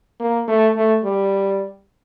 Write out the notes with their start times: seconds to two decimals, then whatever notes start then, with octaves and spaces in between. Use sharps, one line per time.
0.20 A#3
0.48 A3
0.76 A3
1.04 G3